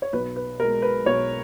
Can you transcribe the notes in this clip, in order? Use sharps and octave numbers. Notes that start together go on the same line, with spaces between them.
C#5
B1 B4
B4
B2 G#3 A#4
B4
B1 C#5